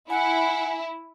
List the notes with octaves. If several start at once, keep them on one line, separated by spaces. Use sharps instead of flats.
E4 F#5 G#5